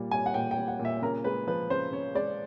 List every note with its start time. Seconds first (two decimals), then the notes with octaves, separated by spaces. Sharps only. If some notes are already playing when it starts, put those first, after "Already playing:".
Already playing: A#2 G3
0.11 G3 G#5
0.26 F#5
0.34 A#2 G5
0.51 G5
0.57 G3
0.68 F#5
0.80 A#2
0.85 E5
1.02 C#3 A#4
1.24 G#3 B4
1.47 F3 B4
1.70 C#3 C5
1.92 C#3 C#5
2.15 G#3 D5